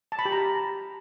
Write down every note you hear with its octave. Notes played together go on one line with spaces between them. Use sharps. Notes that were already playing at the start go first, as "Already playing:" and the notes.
A5
B5
G4
A#5